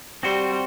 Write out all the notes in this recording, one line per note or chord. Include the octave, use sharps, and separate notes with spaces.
G3 C4 F#4 C5